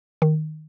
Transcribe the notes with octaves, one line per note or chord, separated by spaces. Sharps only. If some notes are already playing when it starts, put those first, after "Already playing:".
D#3